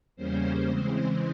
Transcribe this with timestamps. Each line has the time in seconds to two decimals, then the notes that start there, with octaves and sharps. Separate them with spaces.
0.16 E2 C#3 G3 A#3 C#4 C5
0.66 C#3 E3 G#3 C4 C5